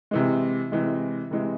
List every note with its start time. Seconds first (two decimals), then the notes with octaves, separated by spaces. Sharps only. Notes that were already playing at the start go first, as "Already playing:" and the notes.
0.11 C3 E3 G#3
0.72 C3 E3 G#3
1.31 C3 E3 G#3